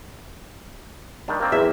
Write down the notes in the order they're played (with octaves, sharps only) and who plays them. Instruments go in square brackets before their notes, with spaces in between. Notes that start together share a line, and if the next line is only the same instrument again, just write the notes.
[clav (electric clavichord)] D#3 G3 D4
A#3 C4 D5
[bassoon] E2 [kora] E5